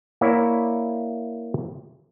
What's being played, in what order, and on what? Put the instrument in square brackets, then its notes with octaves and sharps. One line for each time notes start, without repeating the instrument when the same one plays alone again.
[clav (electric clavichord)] A#3 E4 C#5 D5 E5